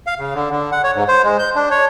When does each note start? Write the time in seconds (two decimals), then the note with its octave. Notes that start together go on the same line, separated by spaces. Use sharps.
0.07 F5
0.19 C#3
0.34 D3
0.51 D3
0.72 F#5
0.84 C#5
0.95 G#2
1.08 C5
1.24 G#3
1.39 G6
1.55 D4
1.71 C#5